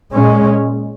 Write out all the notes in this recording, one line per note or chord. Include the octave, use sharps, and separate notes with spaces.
A#2 G#3 C#4